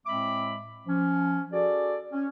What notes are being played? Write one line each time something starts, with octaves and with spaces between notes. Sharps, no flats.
A2 G#3 C4 E5 B5 D6
F3 C#4
F#4 G#4 A4 D5
C#4